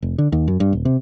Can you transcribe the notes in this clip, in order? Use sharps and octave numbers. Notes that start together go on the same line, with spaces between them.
F1
D3
D#2
F#2
G2
D#1
C3